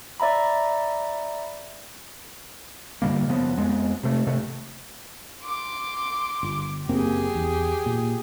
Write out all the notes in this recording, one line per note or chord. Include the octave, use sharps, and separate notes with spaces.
D5 E5 A#5 B5
G2 D3 G3 A#3
F#1 C#3 F3 B3
F2 G#3 B3
C3 A3
G#1 C3 A3
C6 D6
G1
F#1 A#3 C4 G4 G#4
E2
A#2